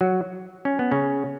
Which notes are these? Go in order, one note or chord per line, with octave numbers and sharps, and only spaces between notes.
F#3 F#4
C#4
B3
C#3 C#4